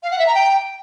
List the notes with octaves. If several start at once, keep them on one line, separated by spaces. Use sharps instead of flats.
F5
F#5
E5
A#5
G5